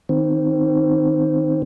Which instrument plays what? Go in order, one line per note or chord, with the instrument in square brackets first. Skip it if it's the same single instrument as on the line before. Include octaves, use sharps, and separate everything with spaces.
[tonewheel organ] D#3 C4